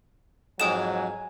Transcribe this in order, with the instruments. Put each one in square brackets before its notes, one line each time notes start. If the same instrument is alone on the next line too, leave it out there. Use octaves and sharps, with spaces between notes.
[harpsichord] F2 G#2 [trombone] F#3 [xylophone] G5 D#6 E7 [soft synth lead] G#5